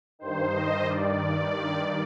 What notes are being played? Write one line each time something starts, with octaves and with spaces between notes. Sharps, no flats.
G2 D#3 C5
D#5
G2 D#3 D5
G2 D#3